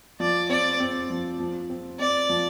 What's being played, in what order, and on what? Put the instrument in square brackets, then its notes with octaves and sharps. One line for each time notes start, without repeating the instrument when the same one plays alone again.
[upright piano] F3 [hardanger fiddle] D5
[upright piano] C4 [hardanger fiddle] D5
[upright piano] C4
F3
F3
C4
[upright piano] C4 [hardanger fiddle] D5
[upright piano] F3